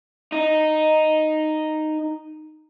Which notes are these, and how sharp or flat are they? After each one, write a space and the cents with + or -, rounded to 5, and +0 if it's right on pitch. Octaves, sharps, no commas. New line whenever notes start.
D#4 -5